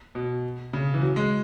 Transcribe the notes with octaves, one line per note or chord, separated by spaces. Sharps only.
B2
C#3
E3
F#3
G#3